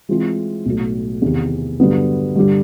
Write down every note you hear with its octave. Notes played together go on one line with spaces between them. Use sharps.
E3 G#3 C4 F4
B1 A2 F#3
E2 C3 D#3
G2 D3 F#3 B3
G2 D3 G3